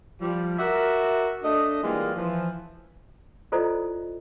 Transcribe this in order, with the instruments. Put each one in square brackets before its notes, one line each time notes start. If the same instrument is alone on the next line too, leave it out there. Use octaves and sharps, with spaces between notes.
[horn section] F3 G3
F#4 A#4 D5 E5
A3 D4 D#5
E3 G3 G#3 A#3 F4
E3 F3
[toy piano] E4 F4 A4 C5 D5 D#5